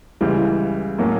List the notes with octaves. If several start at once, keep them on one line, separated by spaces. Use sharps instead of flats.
C#2 C#3 E3 G3
A2 F#3 A#3 C#4